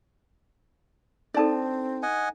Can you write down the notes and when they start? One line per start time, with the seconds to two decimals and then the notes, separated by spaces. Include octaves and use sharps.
1.34 C4 D4 D#4 A4 D5 A5
2.03 D#5 F#5 G#5